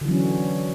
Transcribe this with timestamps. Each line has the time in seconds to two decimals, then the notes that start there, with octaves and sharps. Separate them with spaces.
0.01 D3
0.05 E3
0.08 F#3
0.11 C#4